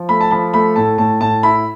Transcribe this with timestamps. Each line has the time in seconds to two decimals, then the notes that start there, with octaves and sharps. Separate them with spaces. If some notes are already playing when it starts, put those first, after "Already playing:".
Already playing: F3
0.09 A3 B5
0.21 A5
0.31 F3 B5
0.54 A3 B5
0.76 A2 A5
0.98 A2 A5
1.21 A2 A5
1.43 E4 B5